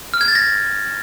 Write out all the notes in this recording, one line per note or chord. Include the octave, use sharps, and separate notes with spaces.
F6
G#6
A6
A#6